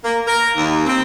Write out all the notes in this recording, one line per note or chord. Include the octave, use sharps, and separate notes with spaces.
A#3
A#4
D#2
C4